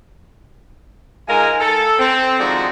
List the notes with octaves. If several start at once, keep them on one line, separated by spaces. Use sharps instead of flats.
G#2 G#3 F4 A#4 G#5
A4
C4
D#3 F3 G#3 D4 D#4 F#4